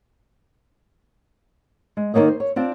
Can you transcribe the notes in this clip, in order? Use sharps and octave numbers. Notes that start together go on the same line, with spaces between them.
G#3
D#3 G#3 A#3 C#5 D#5
C5
C#5
C4 D4 F4 C5